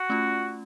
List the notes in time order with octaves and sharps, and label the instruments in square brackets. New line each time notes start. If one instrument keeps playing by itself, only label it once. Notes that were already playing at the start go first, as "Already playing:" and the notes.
Already playing: [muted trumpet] F#4
[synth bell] A3 C#4 F4